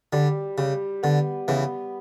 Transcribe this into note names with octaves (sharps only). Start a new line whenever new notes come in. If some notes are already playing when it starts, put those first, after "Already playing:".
D3 G3
C#3 G3
D3 B3
C#3 E3 B3